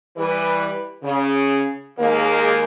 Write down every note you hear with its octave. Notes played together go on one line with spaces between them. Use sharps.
E3 G3 B4
C#3
D#2 G#3 A#3